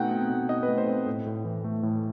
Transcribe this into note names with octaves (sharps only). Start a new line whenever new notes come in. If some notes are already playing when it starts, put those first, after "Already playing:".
Already playing: B2 A3 C4 D#4 F#5 G5
C4
B2
D#4 D#5
B4
A3
C5
C4
A2
A2
E3
A3
A2